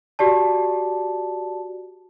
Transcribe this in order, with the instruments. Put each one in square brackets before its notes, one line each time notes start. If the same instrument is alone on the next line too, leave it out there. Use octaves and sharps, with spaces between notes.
[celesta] F#4 G4 D5 A5